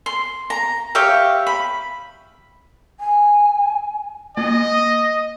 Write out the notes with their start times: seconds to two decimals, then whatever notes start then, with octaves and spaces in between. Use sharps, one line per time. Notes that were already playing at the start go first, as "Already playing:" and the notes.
0.06 C6
0.50 A#5
0.95 G4 C#5 E5 F5
1.47 B5
3.00 G#5
4.37 A#3 D#5